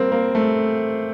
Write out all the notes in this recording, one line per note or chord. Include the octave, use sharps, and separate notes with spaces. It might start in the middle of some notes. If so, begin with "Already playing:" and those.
Already playing: G3 A#3 C4
A#3
A3